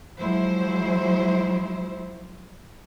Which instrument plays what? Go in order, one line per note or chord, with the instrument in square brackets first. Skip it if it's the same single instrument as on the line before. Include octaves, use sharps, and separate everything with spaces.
[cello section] F3 F#3 G#3 E4 C5